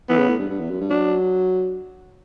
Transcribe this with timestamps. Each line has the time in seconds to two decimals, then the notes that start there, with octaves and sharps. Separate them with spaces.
0.09 E3 B3
0.18 C#3
0.29 A2
0.39 G2
0.49 G2
0.60 E2
0.70 F#2
0.80 G2
0.90 F#3 D4